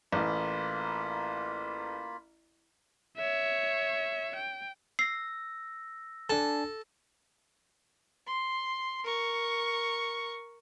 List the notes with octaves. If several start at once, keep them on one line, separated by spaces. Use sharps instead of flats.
A1 A#3 F4 B5
C#5 E5
G5
E6 A#6 C7
D4 A4 G#5 A5
C6
A#4 C#6